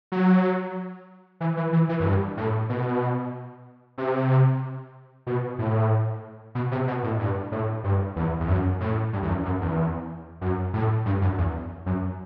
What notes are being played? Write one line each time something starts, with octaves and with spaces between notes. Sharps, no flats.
F#3
E3
E3
E3
E3
F#2
G2
A2
B2
C3
B2
A2
B2
C3
B2
A2
G2
A2
G2
E2
E2
F#2
A2
G2
E2
F#2
F#2
E2
F#2
A2
G2
F#2
E2
F#2